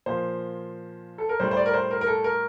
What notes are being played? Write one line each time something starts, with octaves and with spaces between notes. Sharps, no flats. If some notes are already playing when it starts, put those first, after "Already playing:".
A#2 F3 C5
A4
A#4
A2 G3 C5
C5
D5
A#4
C5
A#4
A#4
A4
A#4